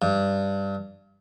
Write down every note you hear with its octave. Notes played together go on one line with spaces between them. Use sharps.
G2